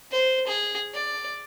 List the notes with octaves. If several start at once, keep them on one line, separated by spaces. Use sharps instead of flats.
C5
G#4
D5